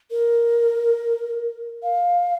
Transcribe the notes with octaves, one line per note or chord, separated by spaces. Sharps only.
A#4
F5